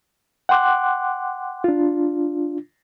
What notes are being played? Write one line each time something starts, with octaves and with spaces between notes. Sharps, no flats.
F#5 G5 C6 D6 F#6
D4 F4